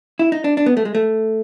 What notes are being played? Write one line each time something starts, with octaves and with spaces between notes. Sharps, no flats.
E4
D#4
D4
D4
B3
A3
G#3
A3